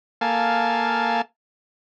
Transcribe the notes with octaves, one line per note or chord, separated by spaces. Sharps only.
A#3 A4 F5 G#5 A5